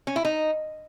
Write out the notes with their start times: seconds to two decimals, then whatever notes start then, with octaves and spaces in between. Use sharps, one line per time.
0.07 C#4
0.16 E4
0.25 D#4